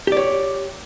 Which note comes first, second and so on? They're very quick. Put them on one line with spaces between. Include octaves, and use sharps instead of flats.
G4 D5 C#5